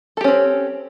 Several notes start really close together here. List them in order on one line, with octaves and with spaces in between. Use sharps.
A4 G4 C#4 C4